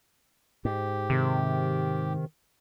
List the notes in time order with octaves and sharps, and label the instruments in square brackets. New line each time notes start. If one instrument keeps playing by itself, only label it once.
[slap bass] G#2 [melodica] G4
[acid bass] C3 [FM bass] D#3